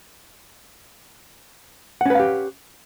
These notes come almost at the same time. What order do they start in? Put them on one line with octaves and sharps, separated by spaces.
F#5 C#4 B4 F5 G4